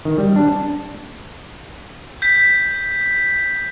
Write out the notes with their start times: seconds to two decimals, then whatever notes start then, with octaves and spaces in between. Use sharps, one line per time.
0.05 D#3
0.18 G3
0.36 D4
0.49 A5
2.22 G6 B6